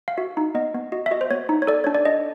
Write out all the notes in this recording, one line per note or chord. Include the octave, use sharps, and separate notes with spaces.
F5
F#4 E5
D#4
B3 D#5
B3
F#4 D#5
E5
F#4 D#5
C5
B3 C#5
D#4
C#5
A4 D5
D4 C#5
D5
D4 D#5